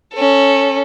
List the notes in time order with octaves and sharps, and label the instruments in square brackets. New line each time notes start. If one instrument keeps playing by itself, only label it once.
[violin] C#4 A4